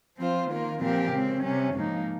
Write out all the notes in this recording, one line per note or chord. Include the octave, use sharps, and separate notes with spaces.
F3 C4 F4 C5
D#3 A#3 F4 A#4
A#2 F3 C4 G4 A#4
C#3 G#3 C4
C3 G3 C#4
G#2 F3 A#3 D#4